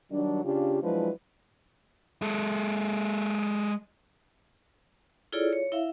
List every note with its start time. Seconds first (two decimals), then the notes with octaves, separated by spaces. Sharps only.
0.11 D#3 F#3 G3 D4
0.44 C#3 D4 F4 G4
0.82 F3 F#3 G#3 D4 E4 B4
2.22 G#3 A4
5.32 E4 F4 G#4 A4 C#5 D5
5.53 C#5
5.72 E4 E5 F5